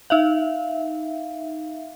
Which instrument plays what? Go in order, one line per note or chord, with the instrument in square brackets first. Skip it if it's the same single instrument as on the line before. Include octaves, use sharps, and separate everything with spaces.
[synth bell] D#4 E5 F5